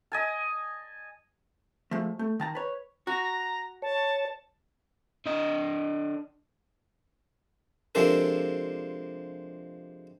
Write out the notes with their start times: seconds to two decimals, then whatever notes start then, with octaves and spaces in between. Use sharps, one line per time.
0.12 D#5 G#5 A5
1.91 F3 G#3 A3
2.19 A3
2.40 D#3 A5 A#5
2.55 B4 C#5
3.07 F#4 A#5
3.82 C#5 A5
5.26 D3 D#5
7.95 C3 F3 G#3 D4 A4 A#4